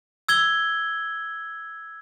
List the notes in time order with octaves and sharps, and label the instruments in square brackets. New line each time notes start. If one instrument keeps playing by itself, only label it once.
[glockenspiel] E6 G#6 G7